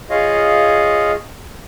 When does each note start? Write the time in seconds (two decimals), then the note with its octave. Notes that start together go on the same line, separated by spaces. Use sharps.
0.10 F4 G#4 C#5 D#5 F5